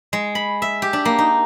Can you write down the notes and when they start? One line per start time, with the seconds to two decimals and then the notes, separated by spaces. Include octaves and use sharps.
0.13 G#3
0.35 B5
0.62 E5
0.82 G4
0.93 D4
1.05 A#3
1.18 D#4